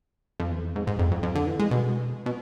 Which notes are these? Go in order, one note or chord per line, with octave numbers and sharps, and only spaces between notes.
F2
E2
F2
G#2
G#2
F2
F2
F2
D3
E3
G#3
B2
B2